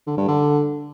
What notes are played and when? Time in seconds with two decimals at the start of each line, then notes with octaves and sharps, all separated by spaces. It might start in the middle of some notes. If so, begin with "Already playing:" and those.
0.07 D3
0.17 G2
0.28 D3